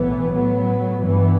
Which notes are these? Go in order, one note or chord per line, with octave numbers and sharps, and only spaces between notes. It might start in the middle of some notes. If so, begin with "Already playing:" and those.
Already playing: B1 A2 E3 B3
A1 A2 F#3 B3
G2 E3 B3